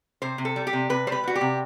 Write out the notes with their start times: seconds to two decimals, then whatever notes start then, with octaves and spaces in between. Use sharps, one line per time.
0.22 C3 C5
0.38 C3
0.45 A4
0.56 G3
0.67 G4
0.73 C3
0.90 C3 B4
1.07 G3 C5
1.12 B4
1.24 G3 F#4
1.35 G4
1.41 C3